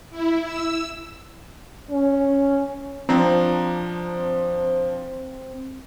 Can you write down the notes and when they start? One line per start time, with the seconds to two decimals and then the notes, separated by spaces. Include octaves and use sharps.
0.10 E4
0.44 E6
1.91 C#4
3.09 F3 C4 D4 A#5